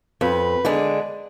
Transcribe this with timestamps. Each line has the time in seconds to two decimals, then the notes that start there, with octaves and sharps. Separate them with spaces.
0.21 F2 B4
0.65 D3 G#3 D4